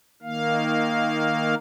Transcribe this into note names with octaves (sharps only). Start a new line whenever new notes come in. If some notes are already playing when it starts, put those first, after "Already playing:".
D#3 A#3 F5